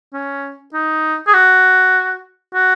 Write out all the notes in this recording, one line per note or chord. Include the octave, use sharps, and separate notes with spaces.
C#4
D#4
G#4
F#4
F#4